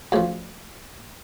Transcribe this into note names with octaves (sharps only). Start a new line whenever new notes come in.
D2 C#3 F3